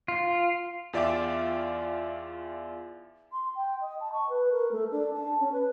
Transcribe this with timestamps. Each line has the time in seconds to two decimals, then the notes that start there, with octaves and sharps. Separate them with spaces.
0.08 F4
0.93 E2 F4 D5 E5 G5 D6
3.32 C6
3.55 G5
3.80 D#5
4.00 A5
4.12 C#6
4.29 B4
4.52 A#4
4.71 A3
4.91 D4
5.13 A5
5.40 C#4
5.52 B4